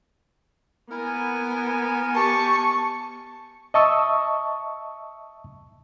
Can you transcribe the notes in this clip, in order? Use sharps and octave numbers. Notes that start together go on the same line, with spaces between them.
B3 E4 A#4 G#5
G4 A5 C#6
D#5 E5 A5 C#6 D#6 E6